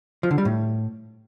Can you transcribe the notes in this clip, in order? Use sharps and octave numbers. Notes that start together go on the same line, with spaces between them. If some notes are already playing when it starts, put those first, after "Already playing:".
F3
D3
G3
A2